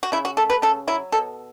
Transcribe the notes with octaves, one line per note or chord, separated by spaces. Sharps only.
F#4
C#3 E4
F#4
A3 A4
B4
C#3 A4
F#3 E4
B2 A4